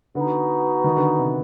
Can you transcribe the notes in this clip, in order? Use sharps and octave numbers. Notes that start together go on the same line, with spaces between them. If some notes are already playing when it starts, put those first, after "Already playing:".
D3 B3 D#4 F#4
D#3
D3
C3